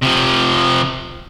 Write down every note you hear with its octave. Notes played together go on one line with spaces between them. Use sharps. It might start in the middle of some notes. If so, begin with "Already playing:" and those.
C3 F3